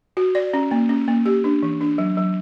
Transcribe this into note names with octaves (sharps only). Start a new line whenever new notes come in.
F#4
D5
C#4
A#3
C#4
A#3
G4
D4
E3
D4
F#3
F#3